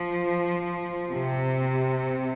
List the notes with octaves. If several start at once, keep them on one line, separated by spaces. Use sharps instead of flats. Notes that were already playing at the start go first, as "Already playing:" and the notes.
Already playing: F3
C3